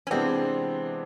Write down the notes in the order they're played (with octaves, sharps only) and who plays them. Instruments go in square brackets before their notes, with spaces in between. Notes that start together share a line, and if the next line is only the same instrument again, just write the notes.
[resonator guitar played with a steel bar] C#4
[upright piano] C3 E3 G#3 B3 D4 [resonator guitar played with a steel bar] C4